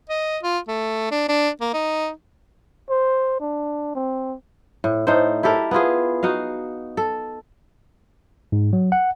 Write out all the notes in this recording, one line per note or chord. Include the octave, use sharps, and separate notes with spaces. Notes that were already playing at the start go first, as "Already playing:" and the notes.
D#5
F4
A3
D4
D4
A#3
D#4
C5
D4
C4
A2
A2 D#4 A4 C5
E4 G4 A4 A#4
B3 E4 F4 G#4
D#4 F#4 D#5 F5
A4
G#2
F#3
F#5